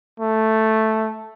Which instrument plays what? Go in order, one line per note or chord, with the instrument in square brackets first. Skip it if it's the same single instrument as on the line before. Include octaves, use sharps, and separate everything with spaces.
[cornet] A3